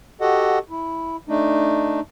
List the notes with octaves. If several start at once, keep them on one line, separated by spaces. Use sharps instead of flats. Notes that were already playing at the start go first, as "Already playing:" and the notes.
F#4 G4 A4 D#5 F#5
E4
A3 D4 D#4